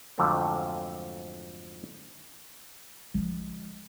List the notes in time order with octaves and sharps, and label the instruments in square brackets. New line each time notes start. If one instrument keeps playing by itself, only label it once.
[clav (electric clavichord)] F2 G#2 D3 F3 F#3 A3
[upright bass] F3 G#3